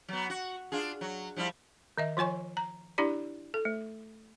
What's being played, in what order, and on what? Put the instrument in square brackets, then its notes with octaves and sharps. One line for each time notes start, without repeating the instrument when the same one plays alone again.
[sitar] F#3 B3
F#4
D4 F4 G#4
F#3
F3 G3 E4
[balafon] D#3 D#5 E5
F3 F4 C#5 G#5 C#6
A#5
D4 E4 G4 D5 B5
A4
A3